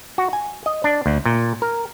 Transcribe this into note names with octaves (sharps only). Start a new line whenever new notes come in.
F#4
G#5
D#5
D4
D2
A#2
A#4